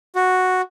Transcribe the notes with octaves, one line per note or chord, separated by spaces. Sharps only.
F#4